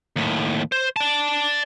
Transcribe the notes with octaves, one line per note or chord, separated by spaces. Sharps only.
D#2 A2
C5
D5 A5